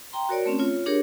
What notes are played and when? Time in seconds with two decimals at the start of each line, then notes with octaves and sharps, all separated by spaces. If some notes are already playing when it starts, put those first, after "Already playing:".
0.13 G5 A#5 C6
0.29 F#4 A#4 C#5 D5
0.46 A3 C4 C#4
0.59 F4 C#5
0.86 D4 G4 G#4 A#4 C#5